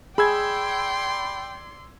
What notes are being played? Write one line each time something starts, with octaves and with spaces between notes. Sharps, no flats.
G#4 D5 G5 B5 C6 E6 G#6